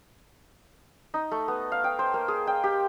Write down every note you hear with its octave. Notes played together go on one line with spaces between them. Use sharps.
D#4
A3
B3
F5
G5
C5
A#3
G#4
G5
G4